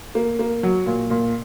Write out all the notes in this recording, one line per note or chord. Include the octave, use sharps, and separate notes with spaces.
A#3
A#3
F#3
A#2
A#2